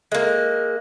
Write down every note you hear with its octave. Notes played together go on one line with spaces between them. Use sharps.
G#3 A#3